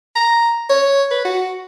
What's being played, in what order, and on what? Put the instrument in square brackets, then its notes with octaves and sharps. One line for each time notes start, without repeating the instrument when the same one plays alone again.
[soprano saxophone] A#5
C#5
B4
F#4